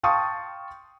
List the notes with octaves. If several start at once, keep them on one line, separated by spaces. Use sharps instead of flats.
F5 G5 A5 C6 C#6 D#6